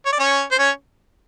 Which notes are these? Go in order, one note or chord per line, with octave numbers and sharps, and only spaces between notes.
C#5
D5
C#4 C#5
C5
C#4 C#5